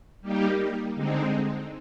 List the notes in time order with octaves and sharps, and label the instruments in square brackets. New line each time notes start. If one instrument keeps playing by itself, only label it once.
[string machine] G3 A#3 D#4 G4
D3 G#3 C4 D#4